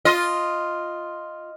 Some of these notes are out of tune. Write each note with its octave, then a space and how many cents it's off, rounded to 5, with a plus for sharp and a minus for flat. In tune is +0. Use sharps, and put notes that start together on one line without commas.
F4 +0 D#5 +0